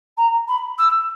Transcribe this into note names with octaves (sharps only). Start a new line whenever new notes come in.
A#5
B5
E6